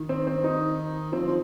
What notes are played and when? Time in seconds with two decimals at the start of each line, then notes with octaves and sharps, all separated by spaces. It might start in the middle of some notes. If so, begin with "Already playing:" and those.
Already playing: D#3
0.09 C4
0.27 C4
0.44 D#4
1.13 F3 C4
1.27 F3